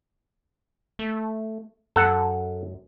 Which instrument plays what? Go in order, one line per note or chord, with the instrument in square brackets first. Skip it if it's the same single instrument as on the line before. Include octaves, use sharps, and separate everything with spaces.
[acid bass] A3
[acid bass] F#2 [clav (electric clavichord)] A4 F#5